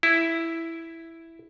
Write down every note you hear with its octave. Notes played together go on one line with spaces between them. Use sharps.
E4